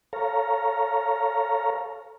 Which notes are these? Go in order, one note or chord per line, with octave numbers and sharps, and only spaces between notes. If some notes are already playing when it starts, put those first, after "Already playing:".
A4 C#5 F5 A#5